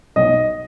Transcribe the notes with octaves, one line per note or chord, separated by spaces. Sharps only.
B1 B2 D#5